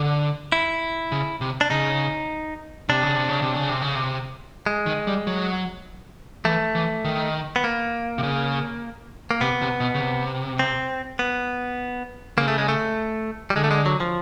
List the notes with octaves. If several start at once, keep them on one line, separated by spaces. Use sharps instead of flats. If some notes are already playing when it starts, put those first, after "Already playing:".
Already playing: D3
E4
C#3
C3
D4
C#3 D#4
C3 D4
C#3
C3
C#3
C3
C#3
C3
C#3
C3
G#3
D#3
G3
F#3
E3 A3
E3
D#3
B3
A#3
C3
C#3
A#3
C3 B3
C3
B2
C#3
C3
C4
B3
C#3 A#3
A3
G#3
A3
G3
D3 G#3
A3
G#3
F#3
F3